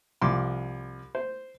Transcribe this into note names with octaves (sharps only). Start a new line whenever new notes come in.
C2 F3 C6 D6
C5